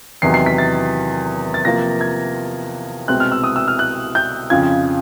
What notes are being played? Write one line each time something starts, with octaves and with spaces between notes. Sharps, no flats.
E2 C3 D#3 F#3 C7
C7
B6
A6
A6
C3 F3 A#3 A#6
G#6
C2 B2 G#3 C4 F#6
F6
E6
D#6
E6
F6
F#6
G6
F2 C#3 F3 G#6